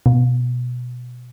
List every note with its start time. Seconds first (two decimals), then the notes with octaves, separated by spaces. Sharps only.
0.06 B2